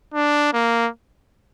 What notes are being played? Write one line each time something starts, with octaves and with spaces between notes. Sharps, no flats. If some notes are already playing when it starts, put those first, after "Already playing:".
D4
A#3